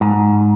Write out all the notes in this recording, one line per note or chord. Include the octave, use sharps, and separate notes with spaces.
G#2